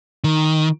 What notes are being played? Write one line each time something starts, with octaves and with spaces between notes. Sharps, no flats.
D#3